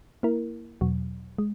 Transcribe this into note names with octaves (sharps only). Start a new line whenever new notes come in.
A#3 E4 A#4
E2 B2 F#3
G#3